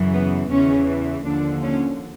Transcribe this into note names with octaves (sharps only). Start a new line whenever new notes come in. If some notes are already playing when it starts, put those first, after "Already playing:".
Already playing: F#2 C#3 E3
B3
E2 C#3 E3 C#4
D#2 D3 F3 D4
C#4